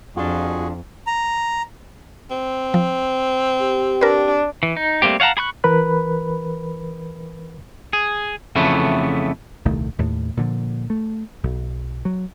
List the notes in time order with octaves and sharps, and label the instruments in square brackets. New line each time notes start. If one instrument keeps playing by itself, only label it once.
[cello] F2 [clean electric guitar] D4 F4 [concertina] F#4 G#4
[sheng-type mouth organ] A#5
[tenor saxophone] C4
[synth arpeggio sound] F3
[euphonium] G4
[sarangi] D4 [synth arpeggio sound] A#4 B4
[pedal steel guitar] E3
D#4
G3 A3 A#3 C4 G4
C#5 F5 F#5 A5 A#5
G#4 B5 C#6 F#6
[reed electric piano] E3 A#4 B4 B5 F#6
[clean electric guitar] G#4
F2 C#3 E3 A3 B3
[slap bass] D#1 C2 D#3 A3
D#2 A2
A#2 D3 F3
A3
B1
F#3